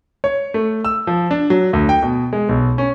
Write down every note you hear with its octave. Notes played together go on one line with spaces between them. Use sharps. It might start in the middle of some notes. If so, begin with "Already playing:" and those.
C#5
A3
E6
F3
D4
F#3
D2
G5
B2
G#3
B1
C#4